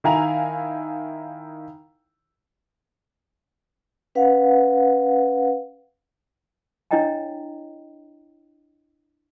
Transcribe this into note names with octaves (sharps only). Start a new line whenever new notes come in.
D#3 E4 F5 G#5 A#5 F7
C#4 B4 F5 F#5
D4 E4 C#5 D#5 G5 A#5